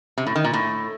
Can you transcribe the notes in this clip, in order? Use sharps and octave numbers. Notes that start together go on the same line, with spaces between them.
C3
A2
D#3
A#2
A2